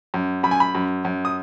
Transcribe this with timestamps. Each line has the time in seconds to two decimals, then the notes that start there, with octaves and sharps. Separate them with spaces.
0.14 F#2
0.43 F#2 B5
0.51 G#5
0.60 B5
0.75 F#2
1.05 F#2
1.25 D#6